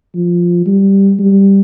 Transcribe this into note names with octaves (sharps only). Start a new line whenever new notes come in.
F3
G3
G3